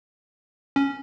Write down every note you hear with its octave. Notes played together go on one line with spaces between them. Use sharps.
C#4